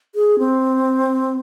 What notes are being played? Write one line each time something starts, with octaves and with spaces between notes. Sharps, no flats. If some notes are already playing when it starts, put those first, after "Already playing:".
G#4
C4